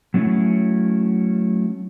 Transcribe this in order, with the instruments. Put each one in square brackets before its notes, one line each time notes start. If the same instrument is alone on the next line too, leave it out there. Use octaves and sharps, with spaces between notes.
[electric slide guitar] F#3 A3 C#4 E4